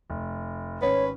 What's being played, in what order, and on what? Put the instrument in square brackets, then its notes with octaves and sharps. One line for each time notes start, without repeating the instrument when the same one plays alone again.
[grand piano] F1
[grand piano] G#1 C#4 [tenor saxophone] B4 [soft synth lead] C#5